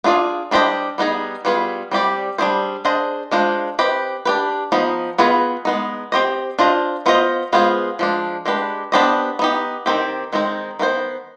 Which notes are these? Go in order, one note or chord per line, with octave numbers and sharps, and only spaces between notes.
B3 D4 F4 G#4 D5
G3 D4 G4 C5 D#5
G3 B3 D#4 G#4
G3 B3 F4 G#4
G3 C4 G4 D5
G3 D4 G#4 C5
D4 G#4 C5 D#5
G#3 D4 F4 C5
C4 G4 B4 D#5
D4 G4 B4
F3 B3 D#4
B3 F4 G#4 B4 D#5
G#3 B3 D#4
C4 G4 C5 D#5
D4 F4 C5 D#5
B3 F4 C5 D#5
G#3 B3 F4 G#4 C5
F3 G#3 D4
G#3 D4 G4 B4
B3 D4 G4 C5 D#5
B3 D#4 G4
D#3 G3 C4 G4
D#3 G#3 C4 D#4
D#3 B3 F4 C5